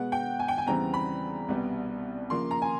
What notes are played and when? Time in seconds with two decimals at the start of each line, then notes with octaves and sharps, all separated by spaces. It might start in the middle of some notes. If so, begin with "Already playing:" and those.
Already playing: B2 G#3 B3 F#5
0.12 G5
0.39 G#5
0.48 G5
0.58 G#5
0.66 E2 C#3 E3 G3 C4 A#5
0.94 B5
1.48 C2 B2 G3 B3
2.30 C#3 F3 A#3 C6
2.51 A#5
2.62 G#5